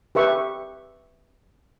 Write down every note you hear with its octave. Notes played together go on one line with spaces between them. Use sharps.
G4 B4 E5 C#6